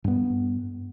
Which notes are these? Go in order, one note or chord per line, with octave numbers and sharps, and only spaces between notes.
G2 B3